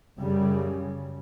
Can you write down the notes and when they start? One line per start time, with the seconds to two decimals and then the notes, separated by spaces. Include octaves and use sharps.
0.19 F#2 C#3 G3